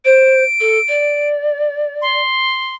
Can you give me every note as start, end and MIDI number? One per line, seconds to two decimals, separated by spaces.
0.05 0.43 72
0.05 1.29 98
0.60 0.78 69
0.88 2.21 74
2.02 2.75 84